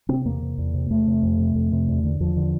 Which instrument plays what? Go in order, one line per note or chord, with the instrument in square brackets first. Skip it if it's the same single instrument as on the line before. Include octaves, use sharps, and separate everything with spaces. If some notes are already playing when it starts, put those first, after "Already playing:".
[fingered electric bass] C3 C4
E2 A#3
C3
E2
C3
E2 A3
C3
F2
C3
F2
C3
E2
D3
E2 F3
D3